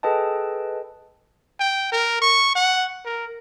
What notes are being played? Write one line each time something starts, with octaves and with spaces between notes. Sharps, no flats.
G#4 A4 B4 D#5 G5 A5
G5
A#4
C#6
F#5
A#4